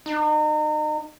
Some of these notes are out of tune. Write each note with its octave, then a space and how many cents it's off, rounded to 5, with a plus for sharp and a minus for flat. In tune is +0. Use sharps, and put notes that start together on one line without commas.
D#4 -35